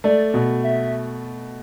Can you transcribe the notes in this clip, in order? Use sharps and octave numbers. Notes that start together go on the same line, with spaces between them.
A3 D5
B2
E5